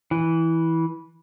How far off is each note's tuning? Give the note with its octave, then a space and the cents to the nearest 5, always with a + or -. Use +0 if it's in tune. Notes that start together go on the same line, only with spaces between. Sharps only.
E3 -10